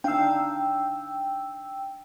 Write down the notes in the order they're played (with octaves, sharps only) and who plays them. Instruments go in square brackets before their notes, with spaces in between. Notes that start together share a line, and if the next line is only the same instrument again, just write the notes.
[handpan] D4 D#4 F5 [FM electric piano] G5 E6